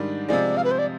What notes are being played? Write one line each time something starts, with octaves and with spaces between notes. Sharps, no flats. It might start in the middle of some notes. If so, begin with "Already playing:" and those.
Already playing: G#2 D#3 G3 D4
C3 F3 G#3 D5
F5
B4
C5
D5